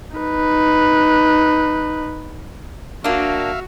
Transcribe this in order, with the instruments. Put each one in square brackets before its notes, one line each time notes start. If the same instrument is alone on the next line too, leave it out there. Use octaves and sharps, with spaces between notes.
[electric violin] D#4 B4
[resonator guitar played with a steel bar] A#3 D4 [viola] F#4 [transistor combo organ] E5 F5